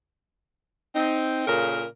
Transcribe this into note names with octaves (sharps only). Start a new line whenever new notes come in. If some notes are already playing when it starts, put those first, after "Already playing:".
C4 D#4
A#2 C#3 A4 A#4